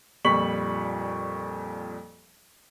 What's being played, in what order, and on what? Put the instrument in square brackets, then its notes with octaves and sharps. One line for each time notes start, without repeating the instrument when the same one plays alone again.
[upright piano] F2 A#2 G3 C#6 B6 F#7